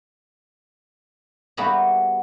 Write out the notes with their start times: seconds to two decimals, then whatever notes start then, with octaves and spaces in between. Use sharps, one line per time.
1.57 G3 A#3 B3 E4 F#4 G#4